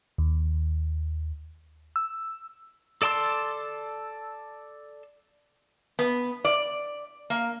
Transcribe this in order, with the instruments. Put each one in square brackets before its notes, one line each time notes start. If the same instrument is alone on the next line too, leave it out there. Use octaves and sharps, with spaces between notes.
[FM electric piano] D#2
E6
[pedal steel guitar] A4 D5 A5 C6 E6
[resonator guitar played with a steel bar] B3
D5
A#3